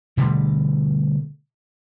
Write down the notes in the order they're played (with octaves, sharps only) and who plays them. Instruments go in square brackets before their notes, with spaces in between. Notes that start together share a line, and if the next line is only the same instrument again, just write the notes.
[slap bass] B2 D3 G3 A3